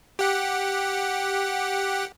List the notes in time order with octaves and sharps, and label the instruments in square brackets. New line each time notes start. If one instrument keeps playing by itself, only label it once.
[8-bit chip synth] G4 F#5